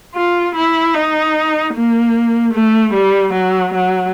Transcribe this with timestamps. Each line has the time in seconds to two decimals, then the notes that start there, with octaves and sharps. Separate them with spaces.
0.15 F4
0.56 E4
0.95 D#4
1.75 A#3
2.54 A3
2.93 G3
3.33 F#3
3.74 F#3